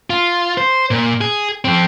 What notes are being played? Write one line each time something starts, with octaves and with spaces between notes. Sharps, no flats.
F4
C5
A#2
G#4
F2 C4